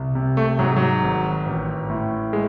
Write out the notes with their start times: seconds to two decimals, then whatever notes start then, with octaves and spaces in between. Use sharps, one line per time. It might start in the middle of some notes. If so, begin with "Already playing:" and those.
Already playing: C2
0.15 C3
0.37 A3
0.59 G#2 F#3
0.76 F#3
1.03 G#1
1.46 A1
1.90 A2
2.33 G#3